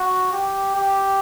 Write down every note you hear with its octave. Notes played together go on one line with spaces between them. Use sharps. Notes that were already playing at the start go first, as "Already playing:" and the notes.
Already playing: F#4
G4
G4